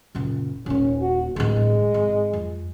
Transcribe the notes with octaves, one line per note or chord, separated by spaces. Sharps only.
F#1 A#2
D#1 A#3 C#4
F#4
D1 A1 G#3
G#1
F2